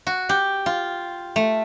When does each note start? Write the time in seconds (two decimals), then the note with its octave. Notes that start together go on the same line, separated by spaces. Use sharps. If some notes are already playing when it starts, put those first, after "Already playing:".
0.07 F#4
0.29 G4
0.66 F4
1.36 A3